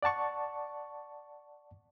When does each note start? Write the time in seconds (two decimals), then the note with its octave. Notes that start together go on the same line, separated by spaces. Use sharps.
0.03 D5 F#5 A5 C#6